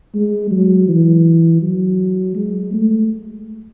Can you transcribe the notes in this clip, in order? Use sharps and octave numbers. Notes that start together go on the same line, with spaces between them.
G#3
F#3
E3
F#3
G#3
A3